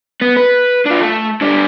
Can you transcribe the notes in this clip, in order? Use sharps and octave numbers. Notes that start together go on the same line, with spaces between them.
B3
B4
D4 F4
A3
D3 G3